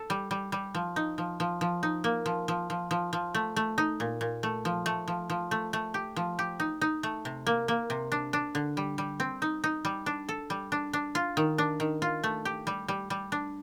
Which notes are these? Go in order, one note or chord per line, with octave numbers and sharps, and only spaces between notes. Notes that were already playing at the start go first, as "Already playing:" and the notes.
Already playing: A4
G3
G3
G3
F3
D#4
F3
F3
F3
D#4
A#3
F3
F3
F3
F3
F3
A3
A3
D#4
A#2
A#2
A3
F3
A3
F3
F3
A3
A3
G4
F3
G4
D#4
D#4
A3
C3
A#3
A#3
C3
D4
D4
D3
G3
G3
C4
D#4
D#4
G3
D4
A4
G3
D4
D4
F4
D#3
D4
D#3
F4
A3
G4
G3
G3
G3
D4